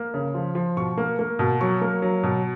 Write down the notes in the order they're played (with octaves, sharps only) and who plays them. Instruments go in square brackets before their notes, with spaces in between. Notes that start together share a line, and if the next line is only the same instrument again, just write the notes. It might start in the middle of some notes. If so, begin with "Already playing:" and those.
Already playing: [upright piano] A#3
C#3
F3
F3
B2 C#6
A#3
A#3
B2
F#3 C#6
A#3
F#3
B2